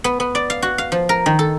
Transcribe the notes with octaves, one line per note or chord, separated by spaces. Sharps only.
B3
B3
D5
F5
F#4
F5
F3
A#4
D#3
A4